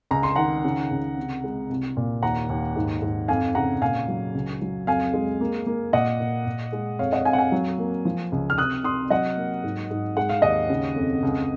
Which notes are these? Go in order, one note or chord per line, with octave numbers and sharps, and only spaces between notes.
C#2 A#5
C6
D#3 F#5 A#5
C#3
C#2
C3
G#3
C2
A#2
D#2 F#5 A#5
D#2
G#2
G#2
F2 F5 G#5
C#3 F#5 A#5
A#2 F5 G#5
F#3
C#2
F#3
F2 F5 G#5
G#3
A#3
A#3
A#2 D#5 F#5
A#2
A#2
G#3
F2 C#5 F5
D#5 F#5
F2 F5 G#5
F#5
F5 G#5
F#3
A#3
F3
C#2
F6
C3 D#6 F#6
C3 C6 D#6
F#3 D#5 F#5
A#3
G#2
G#2
G#3 F#5
F5
D#2 D#5 F#5
C#3
F2
C#2